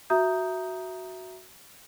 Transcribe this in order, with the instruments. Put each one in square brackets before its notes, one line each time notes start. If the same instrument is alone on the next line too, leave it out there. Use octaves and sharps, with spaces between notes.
[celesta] F#4 E5 A#5 D#6 G6